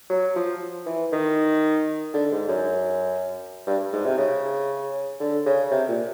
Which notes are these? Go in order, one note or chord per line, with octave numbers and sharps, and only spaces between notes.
F#3
F3
E3
D#3
D3
G#2
F#2
G2
G#2
C3
C#3
D3
C#3
C3
A#2